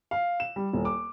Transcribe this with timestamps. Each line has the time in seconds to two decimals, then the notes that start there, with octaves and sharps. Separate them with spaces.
0.11 F5
0.40 E7
0.56 G3
0.73 D#1
0.85 D6